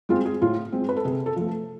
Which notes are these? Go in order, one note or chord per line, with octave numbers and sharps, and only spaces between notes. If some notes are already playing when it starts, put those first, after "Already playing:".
G#3 C4 F4
G#4
A2 F4
G#3 C4
B4
A4
C3 G#4
A4
F3 A3